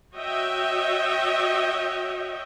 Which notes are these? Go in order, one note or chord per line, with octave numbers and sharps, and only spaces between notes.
F#4 C#5 D#5 E5 G5